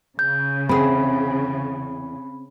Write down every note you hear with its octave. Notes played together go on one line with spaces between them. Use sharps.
C#3 G6
E2 C4 G#4 B5